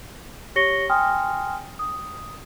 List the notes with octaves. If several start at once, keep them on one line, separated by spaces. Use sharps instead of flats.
G4 C#5 C#6 A#6 C#7 G7
G5 G#5 C6 D#6 F6
D#6